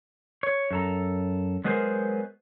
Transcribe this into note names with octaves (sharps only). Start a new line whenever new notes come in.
C#5
F#2 A4 A#5
F#3 G#3 B3 G#4 A#4 C5